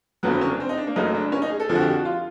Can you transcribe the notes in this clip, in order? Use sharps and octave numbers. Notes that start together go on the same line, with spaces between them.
F#1 F2 D3 F#3 B3
C4
C#4
D4
C4
D#4
D4
A#3
F#1 F#2 C#3 F#3 A3 D#4
D4
C#4
D#4
G#4
A4
F2 D3 F3 G#4
F#4
G4
F#4
F4